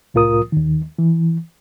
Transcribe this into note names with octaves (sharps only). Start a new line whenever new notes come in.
C2 A2 F4 A#4 D#6
D#2 D#3
E3